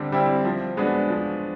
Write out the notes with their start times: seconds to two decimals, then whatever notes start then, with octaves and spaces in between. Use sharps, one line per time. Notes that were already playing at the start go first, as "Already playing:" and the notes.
Already playing: D3 G3 C4
0.12 G3 C4 E4
0.45 F3
0.77 G#3 B3 D4 F#4
1.09 F3